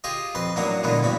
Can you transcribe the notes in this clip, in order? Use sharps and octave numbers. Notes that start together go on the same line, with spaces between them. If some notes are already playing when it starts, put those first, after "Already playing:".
F4 G4 G#4 D#5
F2 B4 C6
A1 F#3 A#3 D4 F#4 D#6
A#2 D3 E3 G#3 B3 D4
A1 E2 G2 F#4 B5